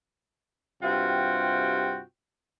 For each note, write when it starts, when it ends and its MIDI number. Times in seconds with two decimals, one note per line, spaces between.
0.83 2.02 43
0.83 2.02 48
0.83 2.02 65
0.83 2.02 66
0.83 2.02 79